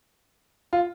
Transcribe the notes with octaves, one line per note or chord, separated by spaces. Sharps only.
F4